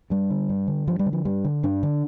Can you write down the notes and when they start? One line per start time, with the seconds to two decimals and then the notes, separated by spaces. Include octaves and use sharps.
0.10 G2 G3
0.30 D3
0.49 G2
0.68 D3
0.87 G2 F3
0.99 G3
1.06 D3
1.13 F3
1.25 G2 G3
1.45 D3
1.63 G2 D4
1.83 D3